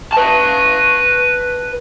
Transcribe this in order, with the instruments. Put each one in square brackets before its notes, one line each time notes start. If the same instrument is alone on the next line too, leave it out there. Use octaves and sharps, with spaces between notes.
[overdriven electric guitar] B4 A5